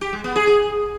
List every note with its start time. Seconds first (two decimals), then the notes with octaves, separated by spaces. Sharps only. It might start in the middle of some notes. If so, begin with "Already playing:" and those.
0.01 G4
0.13 G#3
0.24 B3
0.36 G#4
0.47 G#4